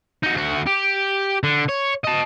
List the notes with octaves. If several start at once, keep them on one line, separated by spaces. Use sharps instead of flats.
D#4 F#4
D2 F#4
G4
D3
C#5
D#5 A5